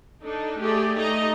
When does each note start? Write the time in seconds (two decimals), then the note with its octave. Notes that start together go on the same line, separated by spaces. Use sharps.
0.23 D4 D#4 A4
0.58 A3 G4 G#4 D5
0.97 A3 D#4 D#5 A#5